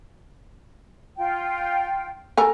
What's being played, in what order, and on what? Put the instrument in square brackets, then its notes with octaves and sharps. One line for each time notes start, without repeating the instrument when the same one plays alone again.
[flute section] F4 G5
[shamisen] A4 A#4 G#5